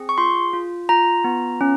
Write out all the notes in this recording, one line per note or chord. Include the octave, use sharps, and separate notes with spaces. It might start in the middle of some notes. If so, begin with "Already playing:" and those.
Already playing: C4 G#4
C#6
F4 C6
F4
F4 A#5
B3
C#4